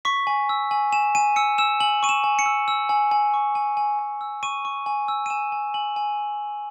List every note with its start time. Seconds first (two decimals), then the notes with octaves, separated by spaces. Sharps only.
0.05 C#6 B6
0.27 G#5
0.49 E6
0.71 G#5
0.92 G#5 E7
1.15 G#5 D#7
1.36 E6 C#7
1.58 E6 E7
1.80 G#5 F#7
2.03 C#6 D#7
2.09 E7
2.24 G#5
2.39 C#7
2.46 E6
2.68 E6
2.89 G#5
3.11 G#5
3.34 C#6
3.55 G#5
3.77 G#5
3.99 G#5
4.21 E6
4.43 C#6 D#7
4.65 C#6
4.86 G#5
5.08 E6
5.26 D#7
5.30 G#5 E7
5.52 G#5
5.74 G#5 F#7
5.96 G#5